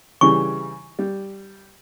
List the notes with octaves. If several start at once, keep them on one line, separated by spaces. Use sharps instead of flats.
C#3 E3 G3 C#6
G3